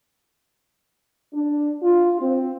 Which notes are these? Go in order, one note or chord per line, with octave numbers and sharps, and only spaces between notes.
D4
F4
C4